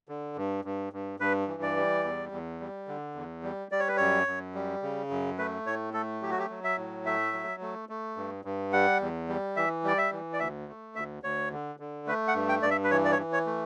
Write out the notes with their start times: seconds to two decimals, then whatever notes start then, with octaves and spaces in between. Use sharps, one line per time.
0.09 D3
0.37 G2
0.65 G2
0.93 G2
1.20 G2 B4
1.48 E3
1.62 D5
1.76 G3
2.04 E2
2.32 E2
2.60 G3
2.88 D3
3.15 E2
3.43 G3
3.72 G3 D5
3.80 C#5
3.88 B4
3.97 F#2 C#5
4.27 F#2
4.55 G3
4.82 C#3
5.10 F#2
5.38 A3 B4
5.66 A2 C#5
5.94 A3 A4
6.22 F#3 G4
6.30 F#4
6.39 G4
6.50 F#3
6.64 E5
6.77 A2
7.06 A3 E5
7.33 F#3
7.61 A3
7.89 A3
8.17 G2
8.45 G2
8.73 G3 F#5
9.01 E2
9.29 G3
9.56 E3 E5
9.84 G3 D5
9.98 E5
10.12 E3
10.33 D5
10.40 D2 E5
10.68 A3
10.96 D2 E5
11.23 D2 C#5
11.52 D3
11.80 D3
12.07 A3 B4
12.28 F#5
12.35 G2
12.49 G5
12.62 G2 D5
12.70 E5
12.84 B4
12.91 E3 C#5
13.05 D5
13.12 C#5
13.19 E3
13.33 C#5
13.46 A3